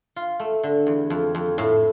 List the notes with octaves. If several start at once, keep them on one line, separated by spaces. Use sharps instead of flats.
F4
A3
D3
E2
F2
F2
A2